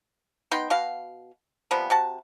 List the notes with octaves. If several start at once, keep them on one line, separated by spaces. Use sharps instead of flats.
B3 D#4 G5 C6
B2 F#4 F5
C3 F3 G3 B3
C3 F#4 A5